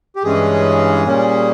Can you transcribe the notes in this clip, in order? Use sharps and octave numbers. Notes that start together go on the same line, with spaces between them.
G4
G2 E3 G#3 C#4 G#4
A#2 G3 A#3 C#4